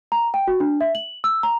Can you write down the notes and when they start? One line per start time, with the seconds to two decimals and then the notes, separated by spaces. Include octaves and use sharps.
0.12 A#5
0.34 G5
0.47 F#4
0.60 D4
0.81 E5
0.95 F#7
1.24 E6
1.43 A#5